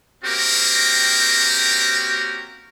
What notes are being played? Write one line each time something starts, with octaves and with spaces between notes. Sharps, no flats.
A#3 C4 C#4 F#4 G4 A#4